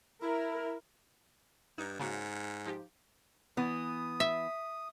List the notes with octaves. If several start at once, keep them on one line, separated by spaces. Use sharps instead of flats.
E4 A#4
G2 D#4
G#2 C#3 A#3 F#4
F3 D#4 G4
E3 B3 D#6
E5